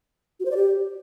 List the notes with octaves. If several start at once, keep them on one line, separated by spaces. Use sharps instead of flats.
F#4
C5
D5
G4